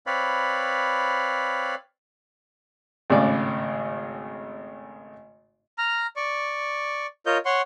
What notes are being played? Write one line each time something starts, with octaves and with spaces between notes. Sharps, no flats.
C4 B4 C#5 D5 F5 B5
G#1 A2 C#3 D5
A#5 F6
D5 C#6
F4 A#4 C#5 D#5 G6
C#5 F#5 C6 C#6